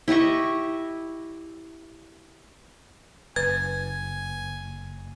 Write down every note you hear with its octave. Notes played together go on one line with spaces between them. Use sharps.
E4 G4 D#5 C#6
F#1 B4 G#5 G#6